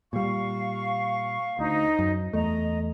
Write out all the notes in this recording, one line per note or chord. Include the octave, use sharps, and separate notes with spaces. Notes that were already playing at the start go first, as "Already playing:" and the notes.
A#2 G3 F5 C#6
D2 D#4 C5
F#2
E2 A3 D#5 A#5